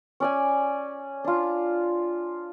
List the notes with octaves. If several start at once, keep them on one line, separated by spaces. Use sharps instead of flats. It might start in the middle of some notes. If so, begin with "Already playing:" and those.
C#4 D5 G#5
D4 F4